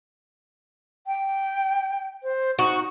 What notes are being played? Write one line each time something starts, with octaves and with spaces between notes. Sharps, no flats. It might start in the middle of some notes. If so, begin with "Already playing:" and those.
G5
C5
D#4 F#4